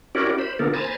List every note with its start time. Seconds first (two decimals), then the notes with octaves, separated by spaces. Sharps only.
0.15 C#4 E4 F#4 G4 A#4 D5
0.39 C5 B5
0.59 D3 A#3 B3 F4 A4 A#4
0.74 C5 G#5 A#5 B5 A6